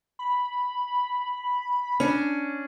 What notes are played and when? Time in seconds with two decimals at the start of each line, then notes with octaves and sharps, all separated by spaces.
0.19 B5
2.00 C#4 D4